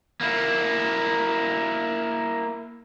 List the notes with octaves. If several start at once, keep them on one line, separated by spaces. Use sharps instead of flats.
A#3 E4